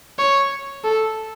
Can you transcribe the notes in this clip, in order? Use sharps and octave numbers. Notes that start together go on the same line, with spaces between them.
C#5
A4